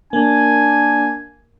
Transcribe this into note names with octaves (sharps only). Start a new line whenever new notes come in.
A#3 D4 G#5